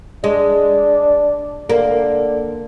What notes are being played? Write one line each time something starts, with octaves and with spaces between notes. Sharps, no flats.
G#3 D4
D3 A#3